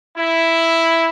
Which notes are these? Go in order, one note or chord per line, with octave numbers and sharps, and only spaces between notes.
E4